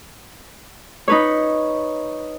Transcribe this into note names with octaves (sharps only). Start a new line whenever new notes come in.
D#4 B4 C#5